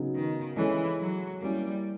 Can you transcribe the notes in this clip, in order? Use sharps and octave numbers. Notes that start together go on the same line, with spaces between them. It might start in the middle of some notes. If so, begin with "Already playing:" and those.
Already playing: C#3 F#3 B3 D#4
D#3
E3 G#3 C#4 E4 A4 C#5
F#3
G3 A#3 C#4 E4